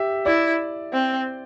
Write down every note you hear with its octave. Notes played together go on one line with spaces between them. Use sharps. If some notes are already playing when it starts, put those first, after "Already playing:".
Already playing: G4 E5
E4 D5
C4